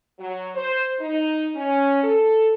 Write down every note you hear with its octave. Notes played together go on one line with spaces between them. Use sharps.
F#3
C5
D#4
C#4
A4